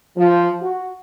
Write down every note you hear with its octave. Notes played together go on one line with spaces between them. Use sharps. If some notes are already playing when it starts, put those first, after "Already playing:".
F3
F#4